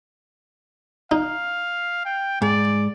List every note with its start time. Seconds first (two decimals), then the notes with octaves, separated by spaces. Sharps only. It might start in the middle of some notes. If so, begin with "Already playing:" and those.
1.11 D#4 F5
2.05 G5
2.42 G#2 D5